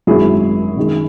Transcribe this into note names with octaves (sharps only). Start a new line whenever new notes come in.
G#1 F#2 D#3 F#3 E4 G#4
F#2 D#3 G#3